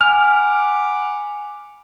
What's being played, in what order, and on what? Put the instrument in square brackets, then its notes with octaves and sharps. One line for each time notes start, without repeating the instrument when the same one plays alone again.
[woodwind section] F#5 B5 D6 [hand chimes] G#5 [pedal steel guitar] F6